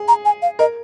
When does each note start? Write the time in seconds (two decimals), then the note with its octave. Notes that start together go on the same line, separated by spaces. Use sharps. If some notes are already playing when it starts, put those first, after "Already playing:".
Already playing: G#4
0.08 A#5
0.25 G#5
0.42 F5
0.59 A#4 D#5